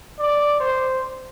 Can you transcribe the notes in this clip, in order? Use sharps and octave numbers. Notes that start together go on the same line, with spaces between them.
D5
C5